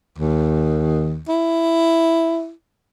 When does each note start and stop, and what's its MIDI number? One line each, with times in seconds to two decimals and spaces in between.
0.18 1.23 39
1.29 2.51 64